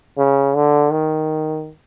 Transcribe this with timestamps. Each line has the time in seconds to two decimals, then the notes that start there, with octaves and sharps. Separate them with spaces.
0.18 C#3
0.55 D3
0.92 D#3